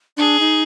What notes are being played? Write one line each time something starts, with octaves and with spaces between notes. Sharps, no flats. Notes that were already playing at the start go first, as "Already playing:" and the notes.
D4 G#4
D#4